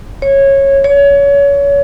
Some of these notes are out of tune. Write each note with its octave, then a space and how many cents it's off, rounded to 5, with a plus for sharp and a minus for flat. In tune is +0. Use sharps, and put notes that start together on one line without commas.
C#5 -15
C#5 +25